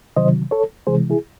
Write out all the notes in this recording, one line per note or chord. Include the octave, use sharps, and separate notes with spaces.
C3 D#3 F#3 C5 D#5
A4 C#5
C3 E3 G#3 G#4 C5
E4 G#4